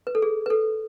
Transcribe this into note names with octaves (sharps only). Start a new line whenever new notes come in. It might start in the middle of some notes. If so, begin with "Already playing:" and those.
B4
A4
G#4
B4
A4